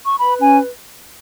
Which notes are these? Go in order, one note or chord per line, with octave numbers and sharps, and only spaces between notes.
C#6
B4 B5
C#4 G#5